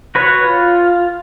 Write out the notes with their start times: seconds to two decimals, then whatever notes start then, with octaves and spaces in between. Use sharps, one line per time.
0.15 F#4 B4 C#5 F#5
0.44 F4